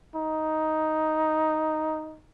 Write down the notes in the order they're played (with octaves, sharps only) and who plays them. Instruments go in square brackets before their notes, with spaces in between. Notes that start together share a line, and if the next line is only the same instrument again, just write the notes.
[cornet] D#4